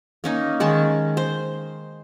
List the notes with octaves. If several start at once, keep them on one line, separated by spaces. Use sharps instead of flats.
A#3 C#4 D#4
D#3 G#3 C#4 A5
C5